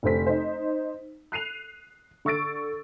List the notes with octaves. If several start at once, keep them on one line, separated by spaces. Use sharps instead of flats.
F1 D3 C5 B6
D#4 C5
F#6 C7 D#7 F7
D3 C#6 E6 A6 D7